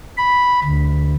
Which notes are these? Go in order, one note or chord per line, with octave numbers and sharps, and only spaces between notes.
B5
D2